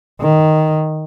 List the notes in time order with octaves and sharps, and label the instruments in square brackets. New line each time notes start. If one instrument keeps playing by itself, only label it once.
[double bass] D#3